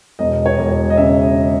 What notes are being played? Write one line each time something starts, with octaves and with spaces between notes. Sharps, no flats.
E1 D#5
C#5
E1
D#5
C#3 E5